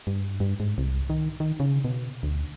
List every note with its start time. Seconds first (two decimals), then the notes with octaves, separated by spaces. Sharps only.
0.07 G2
0.40 G2
0.60 G#2
0.78 C2
1.10 D#3
1.40 D#3
1.60 C#3
1.84 B2
2.23 D2